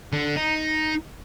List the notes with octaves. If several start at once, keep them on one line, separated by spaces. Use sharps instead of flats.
D3
D#4